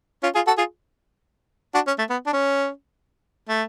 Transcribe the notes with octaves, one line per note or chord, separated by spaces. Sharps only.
C#4 F4
F4 G#4
F#4 A4
F4 G#4
D4 F#4
C#4
A3
B3
D4
C#4
A3